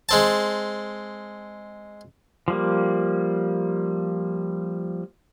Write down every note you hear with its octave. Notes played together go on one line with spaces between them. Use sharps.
G#3 C4 A5
F3 G3 A#3